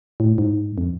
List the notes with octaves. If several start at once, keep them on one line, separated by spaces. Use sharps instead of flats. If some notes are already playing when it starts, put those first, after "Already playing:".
A2
G#2
F2